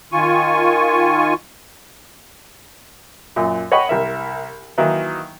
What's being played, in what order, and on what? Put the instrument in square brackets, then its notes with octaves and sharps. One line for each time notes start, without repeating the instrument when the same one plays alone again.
[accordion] D#3 F4 G#5 C#6
[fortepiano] F#2 A#2
C#5 D#5 F#5 G5 B5 C#6
C2 A#4 E5
D#3 E3 F#3 A#3 D#4 E4